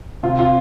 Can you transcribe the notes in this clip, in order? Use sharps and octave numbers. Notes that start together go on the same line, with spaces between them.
C3 F4
F4